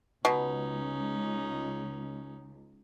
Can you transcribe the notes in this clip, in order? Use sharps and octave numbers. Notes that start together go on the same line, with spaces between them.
C#2 B2 C#4 D#4